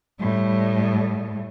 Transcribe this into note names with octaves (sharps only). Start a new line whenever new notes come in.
A2 G3